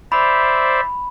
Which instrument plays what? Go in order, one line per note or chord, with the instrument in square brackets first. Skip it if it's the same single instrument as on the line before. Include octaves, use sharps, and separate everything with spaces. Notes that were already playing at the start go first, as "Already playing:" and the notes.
[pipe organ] C5 D5 E5 [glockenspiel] B5